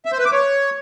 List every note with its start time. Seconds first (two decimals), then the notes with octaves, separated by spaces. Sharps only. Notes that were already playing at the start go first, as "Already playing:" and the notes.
0.05 E5
0.12 C5
0.19 B4
0.26 D6
0.32 C#5